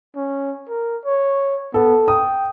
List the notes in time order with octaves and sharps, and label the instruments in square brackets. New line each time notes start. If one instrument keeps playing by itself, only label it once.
[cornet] C#4
A#4
C#5
[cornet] B3 [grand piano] A4
[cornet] G5 [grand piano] D#6